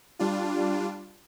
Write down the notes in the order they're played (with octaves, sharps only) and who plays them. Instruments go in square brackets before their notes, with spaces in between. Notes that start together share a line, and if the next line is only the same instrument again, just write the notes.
[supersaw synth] G3 D4 F4